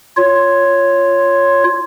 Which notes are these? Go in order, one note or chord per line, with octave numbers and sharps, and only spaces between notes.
F4 C#5